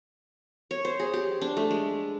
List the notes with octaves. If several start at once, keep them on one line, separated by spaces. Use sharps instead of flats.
C#5
C5
G#4
G4
D4
A3
G#3